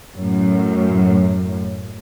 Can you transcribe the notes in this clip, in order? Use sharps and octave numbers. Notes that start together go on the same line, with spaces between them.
F#2 A2